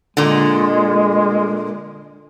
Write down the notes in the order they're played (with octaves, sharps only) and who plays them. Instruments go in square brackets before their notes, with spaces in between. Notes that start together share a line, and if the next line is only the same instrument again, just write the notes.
[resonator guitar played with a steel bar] A#2 D3 [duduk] G#3